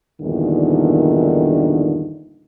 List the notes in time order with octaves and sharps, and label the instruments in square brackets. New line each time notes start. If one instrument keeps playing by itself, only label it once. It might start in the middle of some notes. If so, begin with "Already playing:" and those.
[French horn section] E2 G2 A#2 D3 D#3